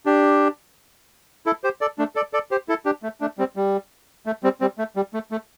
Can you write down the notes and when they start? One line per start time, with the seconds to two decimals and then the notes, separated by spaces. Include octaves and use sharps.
0.06 D4 G4
1.46 E4 A4
1.64 G4 C5
1.81 A4 D5
1.98 A3 D4
2.16 A4 D5
2.33 A4 D5
2.51 G4 C5
2.69 E4 A4
2.85 D4 G4
3.03 A3
3.21 A3 D4
3.38 G3 C4
3.56 G3
4.26 A3
4.43 G3 C4
4.61 G3 C4
4.78 A3
4.96 G3
5.14 A3
5.31 A3